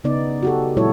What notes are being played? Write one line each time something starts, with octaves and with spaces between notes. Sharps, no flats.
C#3 B3 D#4 D5
F#4 G4 A4
A#2 F#3 G#3 E4 A4 C#5